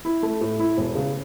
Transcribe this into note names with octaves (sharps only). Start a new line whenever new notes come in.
E4
A3
A2
E4
E1
C#3